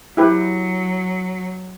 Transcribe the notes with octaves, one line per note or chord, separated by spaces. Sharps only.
F#3 E4 G4 B4